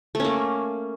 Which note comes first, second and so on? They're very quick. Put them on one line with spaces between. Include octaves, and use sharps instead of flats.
A3 C#4 A#3